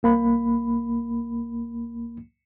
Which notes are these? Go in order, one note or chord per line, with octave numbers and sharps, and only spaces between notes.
C2 A#3 B5